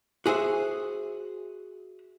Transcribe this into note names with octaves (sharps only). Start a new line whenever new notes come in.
F#4 G#4 C5 E5